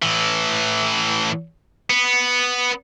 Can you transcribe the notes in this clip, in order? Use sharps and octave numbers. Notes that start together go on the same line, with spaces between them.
A2 E3
B3